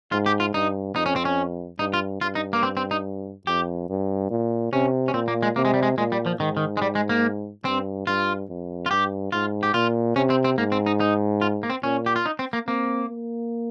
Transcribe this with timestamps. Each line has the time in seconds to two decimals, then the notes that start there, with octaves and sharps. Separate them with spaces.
0.12 G#2 F4
0.26 G4
0.40 F4
0.54 G2 D#4
0.96 F2 D#4
1.06 C#4
1.16 C4
1.25 C#4
1.79 G2 D#4
1.94 F4
2.21 G2 F4
2.35 D#4
2.53 A#3
2.63 C4
2.77 C4
2.91 D#4
3.47 F2 G4
3.89 G2
4.30 A#2
4.72 C3 C#4
5.08 C#4
5.14 A#2 C4
5.28 A#3
5.43 G#3
5.56 C3 A#3
5.65 G#3
5.74 G3
5.83 G#3
5.98 A#2 G#3
6.12 G3
6.26 F3
6.39 G#2 D#3
6.57 D#3
6.77 G#3
6.82 G3
6.95 G#3
7.09 A#3
7.65 G2 C4
8.06 G2 F4
8.49 F2
8.86 F4
8.91 G2 G4
9.32 G#2 F4
9.63 G4
9.74 A#2 F4
10.16 C3 C#4
10.30 C4
10.44 C4
10.58 G#2 A#3
10.72 C4
10.86 D#4
11.00 D#4
11.41 F4
11.63 A#3
11.70 C4
11.83 A#2 C#4
12.06 G4
12.16 F4
12.26 D#4
12.39 C4
12.53 A#3
12.67 A#3 C4
13.10 A#3